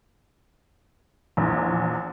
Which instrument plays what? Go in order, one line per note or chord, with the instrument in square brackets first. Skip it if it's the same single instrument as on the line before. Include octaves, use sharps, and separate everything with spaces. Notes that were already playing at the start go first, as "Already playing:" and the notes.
[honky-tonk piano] A#1 E2